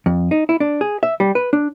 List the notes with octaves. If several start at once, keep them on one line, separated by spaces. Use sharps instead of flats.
F2
D#4
E4
D4
G#4
E5
G3
B4
D4